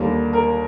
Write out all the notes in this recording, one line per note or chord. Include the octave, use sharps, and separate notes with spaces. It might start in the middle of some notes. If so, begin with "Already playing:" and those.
Already playing: D#2 D3 G3 A#3
A#4